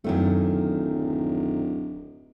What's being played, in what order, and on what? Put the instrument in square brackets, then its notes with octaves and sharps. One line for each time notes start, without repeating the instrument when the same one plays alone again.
[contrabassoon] D1 [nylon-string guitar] F#2 D#3 A3